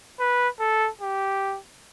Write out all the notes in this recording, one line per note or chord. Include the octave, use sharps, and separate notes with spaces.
B4
A4
G4